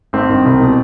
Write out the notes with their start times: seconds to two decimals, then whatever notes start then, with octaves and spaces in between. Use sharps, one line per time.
0.13 G#1 C4
0.29 G2 D#3
0.45 C2
0.60 B2